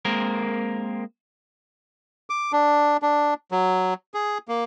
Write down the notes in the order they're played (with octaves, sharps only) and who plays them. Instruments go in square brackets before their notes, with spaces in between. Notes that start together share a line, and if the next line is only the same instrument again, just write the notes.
[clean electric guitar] G#3 A#3 C4 A#4
[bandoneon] D6
D4
D4
F#3
G#4
A#3